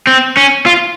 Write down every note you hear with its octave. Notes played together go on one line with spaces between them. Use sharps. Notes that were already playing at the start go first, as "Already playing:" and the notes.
C4
C#4
F4